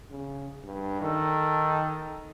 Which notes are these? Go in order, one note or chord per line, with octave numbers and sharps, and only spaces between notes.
C#3
G2
D#3 A4